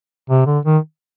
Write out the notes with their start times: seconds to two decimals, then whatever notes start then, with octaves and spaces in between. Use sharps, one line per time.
0.30 C3
0.47 D3
0.65 D#3